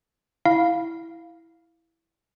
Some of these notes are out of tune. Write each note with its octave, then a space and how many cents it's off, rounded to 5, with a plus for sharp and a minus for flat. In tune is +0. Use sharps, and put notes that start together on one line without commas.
E4 +0 F5 +0